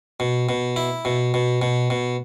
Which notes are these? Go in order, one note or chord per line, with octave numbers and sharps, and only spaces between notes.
B2
B2
E4
B2
B2
B2
B2